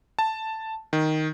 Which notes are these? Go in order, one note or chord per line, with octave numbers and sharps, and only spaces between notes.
A5
D#3